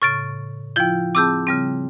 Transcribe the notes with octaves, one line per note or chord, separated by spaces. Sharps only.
A2 C#3 C#6 A6 D7
F3 E4 F4 G5 G6
C4 G#4 A5 D6 E6 G6
C#3 G3 C4